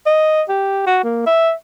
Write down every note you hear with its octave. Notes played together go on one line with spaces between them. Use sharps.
D#5
G4
F#4
A#3
E5